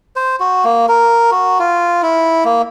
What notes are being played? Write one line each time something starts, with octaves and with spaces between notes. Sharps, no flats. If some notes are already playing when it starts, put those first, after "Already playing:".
C5
F#4
A#3
A#4
F#4
F4
E4
A#3